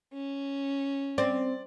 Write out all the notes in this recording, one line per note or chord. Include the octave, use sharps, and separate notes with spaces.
C#4
C4 D5